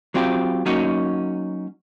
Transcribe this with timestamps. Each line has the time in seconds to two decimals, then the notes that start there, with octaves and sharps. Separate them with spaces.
0.14 F#3 C4 F4 G4
0.66 F#3 A#3 C#4 D#4 F#4